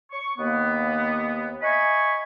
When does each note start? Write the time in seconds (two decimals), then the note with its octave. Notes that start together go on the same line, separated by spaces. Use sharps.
0.12 C#6
0.38 D#2 A#3 B3
1.61 D#5 E5 G#5 B5 C#6